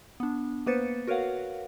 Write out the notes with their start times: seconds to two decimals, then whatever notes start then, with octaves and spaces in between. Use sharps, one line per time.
0.20 B3 D4
0.66 A#3 B3 B4 C5 A6 C#7
1.07 F#4 A#4 B4 C#5 F5 F#5